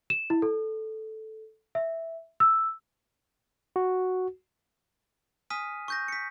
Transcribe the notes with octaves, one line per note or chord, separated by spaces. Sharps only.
E7
E4
A4
E5
E6
F#4
G#5 D#6 F6 B6 D#7
C#6 G6 A#6
B6 C#7